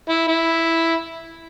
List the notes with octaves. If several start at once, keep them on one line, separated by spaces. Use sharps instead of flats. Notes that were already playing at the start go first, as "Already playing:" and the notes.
E4
E4